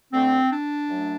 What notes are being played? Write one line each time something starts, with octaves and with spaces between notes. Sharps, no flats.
D2 D3 A3 C4
D4
F#2 F#3 A3